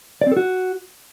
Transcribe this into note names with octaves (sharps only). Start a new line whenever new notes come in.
D5
C4
A4
F#4